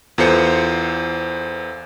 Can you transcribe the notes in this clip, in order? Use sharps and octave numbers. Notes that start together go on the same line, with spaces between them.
E2 E3 F4 A4 C5 C#7